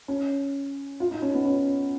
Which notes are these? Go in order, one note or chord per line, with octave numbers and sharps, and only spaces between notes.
C#4
F4
D#4
C#4
B3
C#4